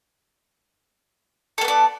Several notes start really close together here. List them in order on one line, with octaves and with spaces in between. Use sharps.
A4 A#3 B3 D5